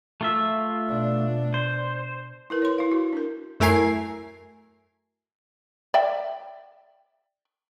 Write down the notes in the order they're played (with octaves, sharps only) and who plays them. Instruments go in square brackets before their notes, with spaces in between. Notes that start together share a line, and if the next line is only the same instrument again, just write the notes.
[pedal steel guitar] A3 F4 E5
[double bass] B2 D4
[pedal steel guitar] C5
[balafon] E4 A#4 B4
C#5 C6
E4 F5
F#4
D4 A#4
[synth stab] F#2 A3 E4 A#4 G#5 C7
[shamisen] D5 E5 G5